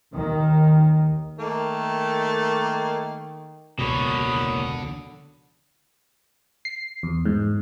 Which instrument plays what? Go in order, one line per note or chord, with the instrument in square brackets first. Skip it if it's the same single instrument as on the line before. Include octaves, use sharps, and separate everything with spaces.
[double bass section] D#2 D#3
[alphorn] D#3 [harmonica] A3 A#3
[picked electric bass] E1 C#2 B2 [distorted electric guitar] D3 [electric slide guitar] A#3 C#5 [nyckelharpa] B5 D#6
[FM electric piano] C7
E2
G#2